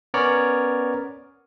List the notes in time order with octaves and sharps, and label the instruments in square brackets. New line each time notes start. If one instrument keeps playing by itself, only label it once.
[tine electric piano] B3 C#4 A#4 C#5 D5